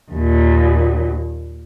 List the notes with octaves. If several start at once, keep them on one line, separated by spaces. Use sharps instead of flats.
D#2 A#2